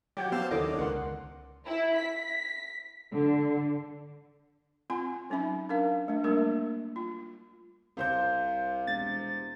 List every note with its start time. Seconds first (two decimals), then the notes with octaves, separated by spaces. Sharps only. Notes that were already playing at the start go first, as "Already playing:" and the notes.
0.17 F3 F#3 G4 C#5 F#5 G6
0.32 B3 C5 F5 A5 E6
0.51 D#2 D3 E4 A4 C#5 D#5 D6
0.79 C#2 A#4 F#5 C6
1.66 E4
1.98 B6
3.13 D3
4.90 C4 F4 G#5 C6
5.30 F#3 C#4 D#4 E5 B5
5.69 D4 A#4 F5
6.08 A3 D4
6.24 G3 A3 A#3 D4 A#4
6.96 F4
7.97 C2 C3 C5 F5 G6
8.87 E1 A6